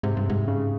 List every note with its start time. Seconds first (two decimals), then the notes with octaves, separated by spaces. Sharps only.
0.03 G#2 C3
0.17 G2
0.30 G#2
0.48 C#3